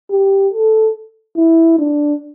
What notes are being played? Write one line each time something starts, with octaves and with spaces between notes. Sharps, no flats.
G4
A4
E4
D4